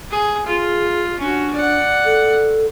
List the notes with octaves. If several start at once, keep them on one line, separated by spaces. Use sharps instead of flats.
G#4
F4 G#4
C#4 D4 F#4
D5 F#5
A4